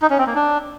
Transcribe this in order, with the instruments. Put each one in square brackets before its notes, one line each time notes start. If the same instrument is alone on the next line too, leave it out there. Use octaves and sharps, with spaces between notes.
[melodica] D#4
C#4
C4
A#3
D4